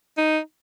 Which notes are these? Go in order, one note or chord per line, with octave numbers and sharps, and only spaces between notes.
D#4